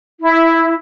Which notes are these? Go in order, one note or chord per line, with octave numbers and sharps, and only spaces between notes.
E4